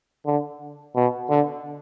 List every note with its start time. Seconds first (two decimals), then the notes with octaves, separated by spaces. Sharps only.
0.26 D3
0.96 B2
1.30 D3